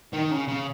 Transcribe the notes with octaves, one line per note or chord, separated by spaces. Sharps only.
D#3
C#3
C#3